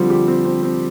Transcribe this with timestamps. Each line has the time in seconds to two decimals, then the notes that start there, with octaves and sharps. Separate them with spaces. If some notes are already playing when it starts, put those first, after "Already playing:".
Already playing: D3 F3 G3 C4
0.10 G4
0.28 C4
0.45 C4
0.63 C4